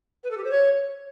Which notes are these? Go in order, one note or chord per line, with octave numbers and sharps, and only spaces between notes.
B4
A4
G4
C5
C#5